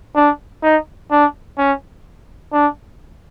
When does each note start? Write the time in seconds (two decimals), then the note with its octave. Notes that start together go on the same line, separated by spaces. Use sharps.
0.16 D4
0.63 D#4
1.11 D4
1.58 C#4
2.53 D4